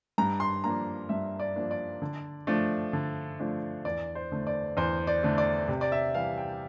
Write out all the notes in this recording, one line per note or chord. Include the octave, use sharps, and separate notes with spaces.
G2 A#5
C6
F3 A#3 D4 A#5
G2 E5
D5
F3 A#3 D4
D5
D3
F3 A3 D4
D3
F3 A3 D4
E2 D5
C5
D3 A3
D5
E2 C5
D5
D3 A3
D5
C3
D5
E5
E3 G3 F5
G5